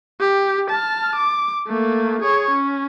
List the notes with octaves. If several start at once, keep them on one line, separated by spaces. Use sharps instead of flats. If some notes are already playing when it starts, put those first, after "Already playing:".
G4
A5 F6
D6
A3 A#3
G#4 C#5
C#4